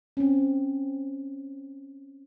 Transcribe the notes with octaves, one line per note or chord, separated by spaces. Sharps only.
C4 C#4